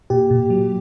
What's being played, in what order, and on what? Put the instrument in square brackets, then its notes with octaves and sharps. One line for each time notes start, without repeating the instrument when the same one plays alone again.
[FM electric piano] A#2 G4
A#2
F#3